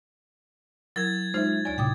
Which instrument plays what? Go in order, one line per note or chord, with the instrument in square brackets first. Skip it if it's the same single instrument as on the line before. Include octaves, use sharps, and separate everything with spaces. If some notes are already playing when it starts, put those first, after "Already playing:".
[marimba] F#3 E4 A#4 [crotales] G#6 A6
[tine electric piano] G#3 E5 [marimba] D#4 F4 C5
[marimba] D2 D5 G#5 [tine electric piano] C#5
[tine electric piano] A2 C3 [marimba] G5 D6 D#6